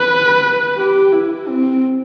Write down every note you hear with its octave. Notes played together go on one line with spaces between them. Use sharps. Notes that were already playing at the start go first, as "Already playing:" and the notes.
Already playing: B4
G4
E4
C4